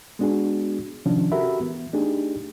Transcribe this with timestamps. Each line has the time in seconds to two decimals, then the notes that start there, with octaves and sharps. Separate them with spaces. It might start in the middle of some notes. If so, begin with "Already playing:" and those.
0.19 G#3 B3 D4 F#4 G#4
1.06 C3 D#3 F3 C#4 D4
1.32 F#4 G4 A4 A#4 E5 B5
1.61 E3 B3
1.93 A3 D4 D#4 G4 G#4